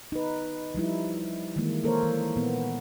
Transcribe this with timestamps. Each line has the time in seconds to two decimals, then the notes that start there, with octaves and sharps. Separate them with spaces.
0.12 D#4 B4
0.75 F3 G3 D#4 E4
1.56 D#3 E3 G#3 A#3
1.84 A#3 A4 A#4 C5 C#5
2.03 E3
2.36 A#2 B3